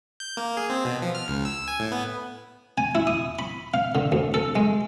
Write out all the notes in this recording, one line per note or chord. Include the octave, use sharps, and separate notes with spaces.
G6
A#3
G#4
C4
B2
F3
F6
C#2
E6
G#5
A2
B3
G#5
E4
D#6
B5
F5
D3
D2
A4
G#3